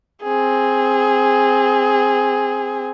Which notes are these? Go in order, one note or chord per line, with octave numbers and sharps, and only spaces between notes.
C4 G#4